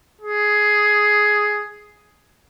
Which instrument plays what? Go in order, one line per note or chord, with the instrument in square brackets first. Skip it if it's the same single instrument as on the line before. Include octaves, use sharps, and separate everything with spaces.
[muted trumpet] G#4